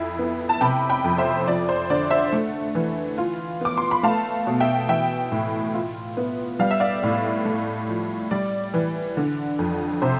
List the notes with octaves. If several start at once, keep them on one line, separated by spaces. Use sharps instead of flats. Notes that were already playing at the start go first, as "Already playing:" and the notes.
Already playing: F2 E4
B3
A5
C3 G5 B5
G5 B5
F2
C5 E5
F3 D5
C5
D3 D5
C5 E5
A3
E3
F4
B3 D6
C6
B5
A3 F5 A5
B2
E5 G5
E3 E5 G5
A2
F4
B3
G3 F5
E5
D5 F5
A2
A3
F3
G3 D5
E3
D3
F2
C3 C5